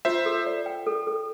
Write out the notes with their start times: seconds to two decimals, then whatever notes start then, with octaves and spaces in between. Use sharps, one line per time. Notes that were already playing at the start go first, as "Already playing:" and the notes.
0.05 F4 C5 E5
0.26 A4
0.46 D5
0.66 G5
0.86 A4
1.07 A4